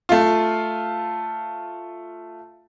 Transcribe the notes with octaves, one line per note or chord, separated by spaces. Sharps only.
A3 F4